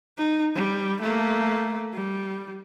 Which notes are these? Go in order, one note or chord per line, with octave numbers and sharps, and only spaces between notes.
D#4
G3
A3 A#3
G3